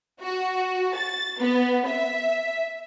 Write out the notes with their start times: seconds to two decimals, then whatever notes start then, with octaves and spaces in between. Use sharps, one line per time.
0.20 F#4
0.95 A6
1.38 B3
1.86 E5